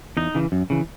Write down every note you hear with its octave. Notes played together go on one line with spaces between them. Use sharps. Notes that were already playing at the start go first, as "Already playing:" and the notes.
E2 D#4
C#3 E3
F#2
C#3 E3